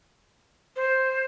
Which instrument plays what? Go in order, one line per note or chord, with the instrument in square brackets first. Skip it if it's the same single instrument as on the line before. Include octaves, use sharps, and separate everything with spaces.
[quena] C5